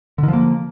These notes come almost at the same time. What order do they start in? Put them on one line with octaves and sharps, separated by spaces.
D3 D#3 F3 A#3